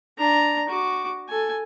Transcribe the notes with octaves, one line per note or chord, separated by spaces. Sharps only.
D4 A#5
F#4 D6
A4 G#5